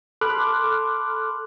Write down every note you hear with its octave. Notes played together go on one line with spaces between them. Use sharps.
A4 B5 C6 D6 F6 F#6